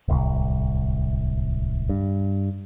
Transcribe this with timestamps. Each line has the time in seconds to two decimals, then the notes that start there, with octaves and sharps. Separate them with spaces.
0.08 D1 C2
1.89 G2